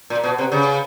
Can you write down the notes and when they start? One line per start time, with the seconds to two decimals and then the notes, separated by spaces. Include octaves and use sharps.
0.10 A#2
0.24 B2
0.38 C3
0.52 C#3